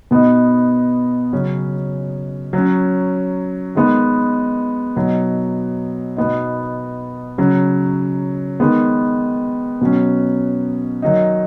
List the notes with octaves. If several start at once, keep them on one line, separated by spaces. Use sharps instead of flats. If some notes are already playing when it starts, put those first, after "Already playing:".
B2 B3 D#4
C#3 F#3 C#4
F#3 C#4
D#3 G#3 B3 D#4
B2 F#3 D#4
B2 B3 D#4
C#3 F#3 C#4
D#3 G#3 B3
B2 F#3 C#4
D#3 F#3 D#4